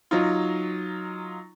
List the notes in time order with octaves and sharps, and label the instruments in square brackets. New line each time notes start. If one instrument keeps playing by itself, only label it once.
[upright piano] F#3 D#4 F4